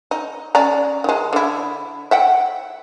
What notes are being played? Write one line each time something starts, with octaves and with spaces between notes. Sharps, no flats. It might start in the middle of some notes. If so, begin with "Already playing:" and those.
D#4
C#4 D5 A#5
D#3 G#3
D3 E4
E5 F#5 G5